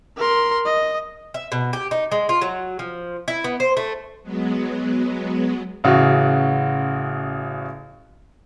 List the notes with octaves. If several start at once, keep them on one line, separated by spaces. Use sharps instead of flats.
A#4 C6
D#5
E5
B2
G4
D#4
G#3
F4
F#3
F3
E4
B3
C5
A3
F#3 G#3 B3
A1 C#3 F#4